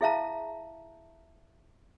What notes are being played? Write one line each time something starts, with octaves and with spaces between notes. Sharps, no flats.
E4 G#4 E5 F5 A5 A#5